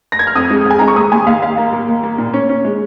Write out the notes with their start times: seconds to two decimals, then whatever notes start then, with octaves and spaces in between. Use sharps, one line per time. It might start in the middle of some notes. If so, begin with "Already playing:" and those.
0.12 A#6
0.19 G#6
0.27 F6
0.35 F2 D#6
0.50 G#3
0.66 F2 G#5
0.79 G#3 A#5
0.88 C#6
0.96 D#2 D#6
1.12 D#2 G#5
1.27 D#2 F5
1.42 D#2 F5
1.58 A#3
1.73 A#3
1.88 D#2
2.03 A#3
2.18 A#2
2.34 C#4
2.49 C#4
2.65 G#3